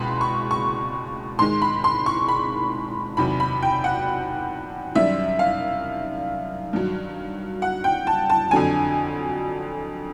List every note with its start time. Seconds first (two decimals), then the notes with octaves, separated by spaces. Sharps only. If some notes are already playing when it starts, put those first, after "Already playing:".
Already playing: C#2 B2 G#3 B5 C6
0.21 C#6
0.51 C#6
1.39 G#2 D#3 G#3 C6
1.62 B5
1.84 C6
2.06 C#6
2.28 B5
3.17 E2 C3 D#3 F#3 B5
3.40 B5
3.62 G5
3.84 F#5
4.95 F#2 D#3 G3 E5
5.39 F5
6.73 G2 D#3 F#3
7.62 F#5
7.84 G5
8.07 A5
8.30 A5
8.51 F2 D3 F#3 G#5